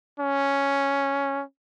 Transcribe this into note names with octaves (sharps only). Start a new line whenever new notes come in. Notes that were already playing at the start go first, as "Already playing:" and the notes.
C#4